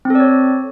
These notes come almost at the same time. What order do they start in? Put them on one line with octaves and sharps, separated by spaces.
C4 A4 D5 C#5